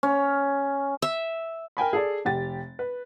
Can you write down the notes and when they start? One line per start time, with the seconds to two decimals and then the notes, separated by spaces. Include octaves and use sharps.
0.03 C#4
1.02 E5
1.77 A#4 G5 G#5 B5
1.93 G#4 A4 D5
2.25 F1 G4 A6
2.79 B4